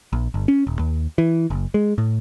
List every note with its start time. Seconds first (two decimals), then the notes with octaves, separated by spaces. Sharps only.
0.13 A#1
0.34 G1
0.48 C#4
0.67 D#1
0.79 D#2
1.18 E3
1.50 F#1
1.74 G#3
1.98 A2